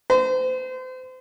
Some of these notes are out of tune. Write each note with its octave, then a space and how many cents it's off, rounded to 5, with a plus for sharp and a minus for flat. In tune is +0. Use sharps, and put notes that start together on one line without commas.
C5 -35